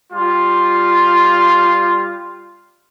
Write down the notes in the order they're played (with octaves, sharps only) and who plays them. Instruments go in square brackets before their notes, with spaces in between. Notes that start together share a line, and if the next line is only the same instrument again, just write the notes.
[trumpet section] G3 F4